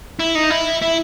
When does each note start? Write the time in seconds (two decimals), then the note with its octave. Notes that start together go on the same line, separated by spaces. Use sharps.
0.20 E4
0.35 D#4
0.50 E4
0.82 E4